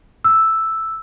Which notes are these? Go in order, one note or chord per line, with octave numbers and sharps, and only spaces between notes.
E6